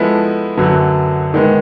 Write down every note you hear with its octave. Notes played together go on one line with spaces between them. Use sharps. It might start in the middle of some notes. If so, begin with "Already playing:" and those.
Already playing: F3 G#3 B3 E4 A4
F#2 D3 F#3 B3
D#3 G#3 B3